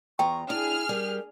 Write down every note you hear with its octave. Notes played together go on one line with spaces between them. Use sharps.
E2 F4 G5 A#5 C#6
D4 E4 G#4 F6
G3 A#4